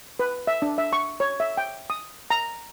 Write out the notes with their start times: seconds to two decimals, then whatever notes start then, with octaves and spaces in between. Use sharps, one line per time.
0.19 B4
0.47 E5
0.62 D4
0.78 E5
0.93 C#6
1.20 C#5
1.40 E5
1.57 G5
1.90 D#6
2.30 A#5